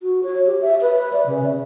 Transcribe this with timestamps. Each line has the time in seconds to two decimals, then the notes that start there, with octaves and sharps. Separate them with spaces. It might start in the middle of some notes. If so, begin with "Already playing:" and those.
0.03 F#4
0.24 C#5
0.47 G4
0.62 E5
0.81 B4
1.13 D5
1.26 C#3
1.45 E5